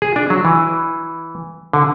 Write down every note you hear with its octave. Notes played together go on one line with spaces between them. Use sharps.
G#4
D4
F#3
E3
D3